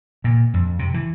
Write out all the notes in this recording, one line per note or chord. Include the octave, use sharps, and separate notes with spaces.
A#2
F2
C3
E3